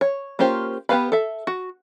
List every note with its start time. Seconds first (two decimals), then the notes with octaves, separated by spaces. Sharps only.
0.01 C#5
0.39 A#3 C#4 F4 G4 C5
0.89 B3 G4 B4 F5 B5
1.12 A4 E5
1.47 F#4